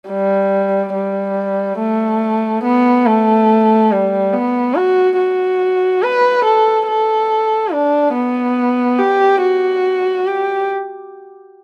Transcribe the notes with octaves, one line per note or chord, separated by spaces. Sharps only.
G3
G3
A3
B3
A3
G3
B3
F#4
F#4
B4
A4
A4
D4
B3
G4
F#4
G4